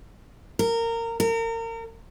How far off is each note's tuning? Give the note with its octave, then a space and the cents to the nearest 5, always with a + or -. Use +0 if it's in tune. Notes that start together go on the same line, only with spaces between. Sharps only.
A#4 -20
A#4 -35